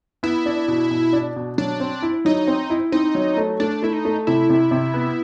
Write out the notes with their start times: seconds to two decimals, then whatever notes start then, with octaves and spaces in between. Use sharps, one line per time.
0.23 B3 E4
0.46 D4
0.68 B2
0.91 B2
1.13 D4
1.36 B2
1.58 F#3 D4
1.80 C4
2.02 E4
2.25 F#3 D#4
2.47 C4
2.70 E4
2.92 C4 D#4
3.15 F#3
3.37 A3
3.60 A3 D4
3.82 A3 E4
3.93 D#4
4.05 A3
4.27 C3 E4
4.49 C3
4.71 C3
4.94 B3